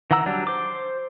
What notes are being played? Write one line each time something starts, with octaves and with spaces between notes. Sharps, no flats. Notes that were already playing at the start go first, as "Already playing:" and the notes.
D#3 E3 F#5 A#5 E6
F#3 G3 D4
C5 D6